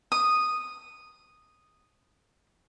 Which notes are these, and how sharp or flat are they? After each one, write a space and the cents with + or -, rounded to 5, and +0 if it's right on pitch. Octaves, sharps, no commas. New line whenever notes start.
D#6 -5